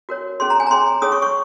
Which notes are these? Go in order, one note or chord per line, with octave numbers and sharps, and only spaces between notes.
F#4 A#4 C#5
C#4 G#4 C#5 C6
A#5
G#5
A#5
C#4 G#4 C#5 C6
C#4 G#4 C#5 D#6
C#6
C#6